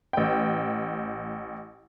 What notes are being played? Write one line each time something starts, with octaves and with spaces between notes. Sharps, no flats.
A1 G5